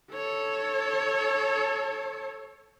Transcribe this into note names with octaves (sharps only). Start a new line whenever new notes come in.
A4 C#5